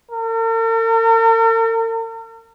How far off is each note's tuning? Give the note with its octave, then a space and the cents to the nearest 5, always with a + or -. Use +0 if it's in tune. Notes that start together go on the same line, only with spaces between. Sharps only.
A#4 -45